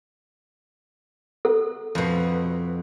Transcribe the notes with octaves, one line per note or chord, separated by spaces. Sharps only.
A4
F2 B2